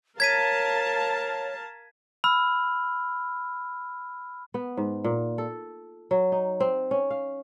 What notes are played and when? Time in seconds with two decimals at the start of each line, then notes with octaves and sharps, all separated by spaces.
0.20 A#4 C#5 F5 A5 G#6 B6 D#7
2.24 B5 E6 F6
4.54 B3
4.77 G#2
5.04 A#2
5.38 A4
6.11 F#3
6.32 D#4
6.60 C4
6.91 C#4
7.10 F5